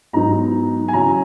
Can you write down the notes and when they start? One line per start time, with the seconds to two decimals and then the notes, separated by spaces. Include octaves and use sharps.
0.13 G#2 F#3 B3 D#4 A#5
0.88 G#5
0.93 C#3 F#3 C#4 E4 A#5